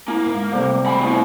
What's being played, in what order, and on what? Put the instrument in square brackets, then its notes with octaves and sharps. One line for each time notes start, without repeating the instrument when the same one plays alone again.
[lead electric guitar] A#3 [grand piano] E4
[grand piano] G#2
C3 G3 A3
[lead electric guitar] D#3 B5
A2 B3